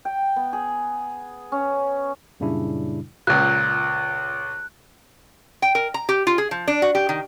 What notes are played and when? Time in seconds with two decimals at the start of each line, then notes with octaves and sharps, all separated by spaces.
0.05 G5
0.36 B3
0.53 G#4
1.52 C#4
2.40 F#2 A#2 C#3 G3 D4 E4
3.27 C#2 A#2 F#6
5.62 G5
5.75 A#4
5.94 A#5
6.09 G4
6.27 F4
6.38 G#4
6.51 F3
6.68 D4
6.82 F#4
6.95 G4
7.09 D#3